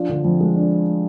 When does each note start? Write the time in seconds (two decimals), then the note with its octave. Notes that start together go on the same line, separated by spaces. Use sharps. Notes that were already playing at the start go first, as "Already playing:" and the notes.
Already playing: F3 D4
0.09 D3
0.24 F2
0.40 G#3
0.56 D4